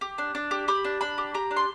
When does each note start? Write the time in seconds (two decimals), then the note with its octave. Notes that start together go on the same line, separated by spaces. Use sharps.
0.01 G4
0.18 D4
0.35 D4
0.51 G4
0.68 G4 B5
0.84 D4
1.01 D4 B5
1.18 G4
1.34 G4 A#5
1.51 D4
1.57 C6